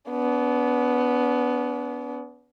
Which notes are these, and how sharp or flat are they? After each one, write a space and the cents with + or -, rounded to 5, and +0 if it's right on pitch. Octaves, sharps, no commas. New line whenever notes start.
B3 +0 D4 -40